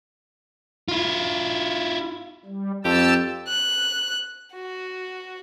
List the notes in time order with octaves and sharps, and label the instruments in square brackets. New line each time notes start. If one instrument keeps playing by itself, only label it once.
[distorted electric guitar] E4 F4
[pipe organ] G3
[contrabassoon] F2 [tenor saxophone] G4 [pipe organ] A5 E6
[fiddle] F#6
F#4